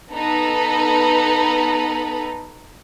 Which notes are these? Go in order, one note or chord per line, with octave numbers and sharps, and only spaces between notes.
B3 D#4 A4 B4